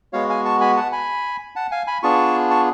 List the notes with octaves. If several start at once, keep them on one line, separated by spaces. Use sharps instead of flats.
G#3 B3 F#4 C#5 F5
F5 G#5
A5 C#6
G#5 B5
F#5 A5
G#5 B5
F#5 A5
F5 G#5
G#5 B5
B3 D4 F4 G#4 A5 C#6
A5 C#6